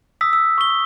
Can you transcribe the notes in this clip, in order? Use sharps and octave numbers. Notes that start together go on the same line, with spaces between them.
D#6 E6 B6
E6
C#6 G7